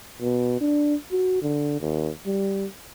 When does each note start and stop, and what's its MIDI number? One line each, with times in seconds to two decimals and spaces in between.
0.21 0.60 47
0.61 0.95 62
1.12 1.42 66
1.42 1.80 50
1.80 2.11 39
2.26 2.66 55